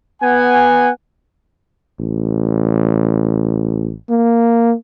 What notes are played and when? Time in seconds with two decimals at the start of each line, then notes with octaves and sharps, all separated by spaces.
0.22 B3 F#5 G#5
1.99 A1
4.10 A#3